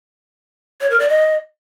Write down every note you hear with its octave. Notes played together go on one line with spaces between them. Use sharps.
C#5
A#4
D5
D#5